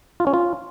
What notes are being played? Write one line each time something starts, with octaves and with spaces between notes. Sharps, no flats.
F4
C#4
F4